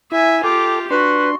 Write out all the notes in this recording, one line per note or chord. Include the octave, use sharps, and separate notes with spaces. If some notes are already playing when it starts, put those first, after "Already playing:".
E4 E5 G#5
F4 G4 A4 G5 D6
D4 F#4 B4 C6